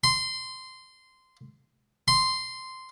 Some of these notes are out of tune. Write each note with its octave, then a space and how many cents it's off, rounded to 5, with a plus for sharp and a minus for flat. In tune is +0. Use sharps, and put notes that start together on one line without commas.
C6 -15
C6 -10